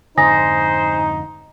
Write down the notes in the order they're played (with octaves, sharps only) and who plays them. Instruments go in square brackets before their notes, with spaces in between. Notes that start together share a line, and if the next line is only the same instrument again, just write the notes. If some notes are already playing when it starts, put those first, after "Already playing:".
[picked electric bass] F2 G#2 D3 [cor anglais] D#4 [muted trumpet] C5 [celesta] G#5 D#6 A#6